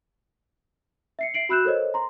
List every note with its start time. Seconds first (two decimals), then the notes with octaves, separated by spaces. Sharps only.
1.19 E5 C7 C#7
1.34 E5 C7 D7 F#7
1.49 F#4 B5 E6 F#6 G6 E7
1.65 A4 A#4 C5 C#5 D#5
1.94 A#5 C6